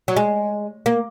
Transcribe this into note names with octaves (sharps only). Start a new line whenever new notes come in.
F#3
G#3
A#3